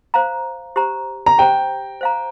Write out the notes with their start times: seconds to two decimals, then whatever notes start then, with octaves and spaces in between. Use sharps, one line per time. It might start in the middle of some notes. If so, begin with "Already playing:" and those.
0.14 C5 F5 A#5
0.76 G4 C5 A#5
1.26 A#5
1.38 G4 C5 G5 A#5
2.01 C5 F5 A#5